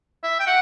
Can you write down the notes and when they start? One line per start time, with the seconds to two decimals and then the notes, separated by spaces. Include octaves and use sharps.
0.24 E5
0.40 G5
0.47 F#5